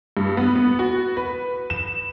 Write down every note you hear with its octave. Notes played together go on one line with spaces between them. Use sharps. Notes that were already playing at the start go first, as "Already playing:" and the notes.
G2
B3
B3
F#4
B4
E7